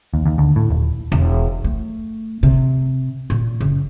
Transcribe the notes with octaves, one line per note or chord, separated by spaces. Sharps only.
D#2
D#2
D2
A2
D#1
E1
A3
C3
A#2
F#1